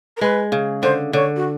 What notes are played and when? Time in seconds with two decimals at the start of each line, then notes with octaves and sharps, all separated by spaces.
0.17 A#4
0.21 G#3 B4
0.52 C#3
0.82 D3 C5
1.13 D3 C#5
1.36 F#4